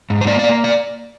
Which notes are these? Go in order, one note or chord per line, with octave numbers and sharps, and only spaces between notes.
G#2
C5
A#3 D5
D5
A#3
D5